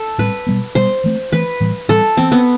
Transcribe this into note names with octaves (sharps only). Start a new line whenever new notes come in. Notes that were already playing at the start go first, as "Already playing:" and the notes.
Already playing: A4
A2 G3 C4 B4
B2 G3 B3
B2 G3 B3 C5
E3 A3 C4
E3 A3 C4 B4
A2 E3 G3 C4
A2 E3 G3 C4 A4
E3 B3 C4
B3